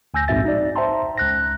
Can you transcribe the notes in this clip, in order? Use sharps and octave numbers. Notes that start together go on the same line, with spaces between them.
D2 G#5 E6 G6 A#6
A#1 G#2 C4 F#4 E5 A6
D#4 D5
C5 E5 G5 A5 A#5 C6
C#2 F#6 A#6